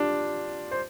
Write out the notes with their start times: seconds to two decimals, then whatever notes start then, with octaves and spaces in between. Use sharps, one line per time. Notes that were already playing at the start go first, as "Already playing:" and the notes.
Already playing: D4 F4 G4
0.71 C5